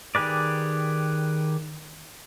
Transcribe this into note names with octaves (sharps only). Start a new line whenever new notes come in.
D#3 G4 G#4 B4 D5